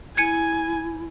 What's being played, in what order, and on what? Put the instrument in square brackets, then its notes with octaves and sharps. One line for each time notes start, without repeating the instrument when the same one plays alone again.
[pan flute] E4 [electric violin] G#5 [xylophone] G#6 C#7 D#7